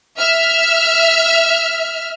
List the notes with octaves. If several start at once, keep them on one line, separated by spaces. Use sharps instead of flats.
E5 F6